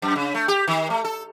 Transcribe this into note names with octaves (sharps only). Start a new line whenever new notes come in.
F#2
C#3
A3
G4
D#3
A3
A4